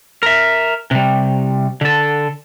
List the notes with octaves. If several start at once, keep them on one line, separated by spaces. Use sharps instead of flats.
A#4 E5
C3 G3
D3 A4